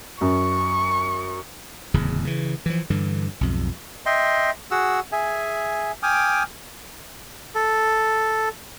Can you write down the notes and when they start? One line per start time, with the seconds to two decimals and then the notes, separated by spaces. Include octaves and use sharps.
0.21 F#2 C#6
1.94 D1 E2 C#3
2.25 C#3 E3
2.66 E3 F3
2.90 G2 D3 E3
3.41 B1 F2 G#2
4.06 D#5 E5 G5 C6
4.71 F#4 G#4 F#5 E6
5.12 G#4 E5 G#5
6.03 G5 G#5 D6 D#6 F6
7.55 A4